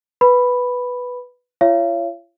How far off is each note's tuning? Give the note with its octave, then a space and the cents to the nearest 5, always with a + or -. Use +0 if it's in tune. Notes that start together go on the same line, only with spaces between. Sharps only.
B4 +0 B5 +0
F4 -45 C#5 +0 F5 -45